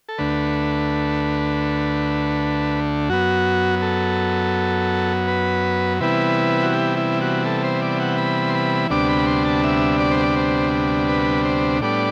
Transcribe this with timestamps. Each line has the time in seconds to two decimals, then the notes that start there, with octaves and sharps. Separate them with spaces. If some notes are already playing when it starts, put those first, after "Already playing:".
0.09 A4
0.18 D2 D3 A3 B4
3.09 F#2 F#3 B3 F#4
3.82 A4
5.28 B4
6.00 C3 E3 G3 B3 E4 B4
6.63 F#4
6.73 G4
6.97 E4
7.21 F#4
7.46 A4
7.64 C5
7.82 D5
8.00 F#5
8.18 B5
8.49 C6
8.55 B5
8.90 D2 C3 G3 B3 D4 D6
9.09 B5
9.27 C6
9.45 A5
9.64 E5
10.00 D5
10.11 C5
10.23 D5
10.36 C5
11.09 B4
11.45 C5
11.82 A2 G3 B3 D4 D5